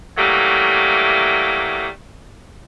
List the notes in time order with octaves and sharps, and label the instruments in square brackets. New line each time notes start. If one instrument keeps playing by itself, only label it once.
[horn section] E3 F#3 G3 A3 A#3